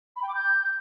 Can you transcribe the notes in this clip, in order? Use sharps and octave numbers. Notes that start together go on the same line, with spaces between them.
B5
G5
D6
G6